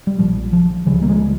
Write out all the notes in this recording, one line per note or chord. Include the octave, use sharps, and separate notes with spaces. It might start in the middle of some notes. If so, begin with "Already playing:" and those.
G3
A#1 A#2 F3
F3
C#2 C#3 E3 G3
A#3
F3 G#3